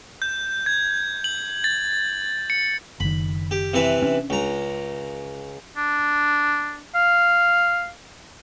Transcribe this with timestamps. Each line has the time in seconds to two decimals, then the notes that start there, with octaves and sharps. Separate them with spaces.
0.22 G6
0.66 G#6
1.24 F#7
1.64 A6
2.50 C#7
3.00 F#1 D#3 B5
3.51 G4
3.74 C3 E3 B4
4.02 C#4 D4
4.30 C#2 A#5
5.77 D4
6.95 F5